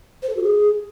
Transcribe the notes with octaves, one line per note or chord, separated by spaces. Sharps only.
C5
A4
F#4
G#4